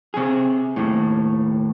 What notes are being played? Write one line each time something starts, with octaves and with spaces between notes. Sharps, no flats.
C3 G#4
D#2 A2